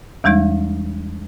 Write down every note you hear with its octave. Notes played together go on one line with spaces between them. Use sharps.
E2 E3 G3 G#3 D#4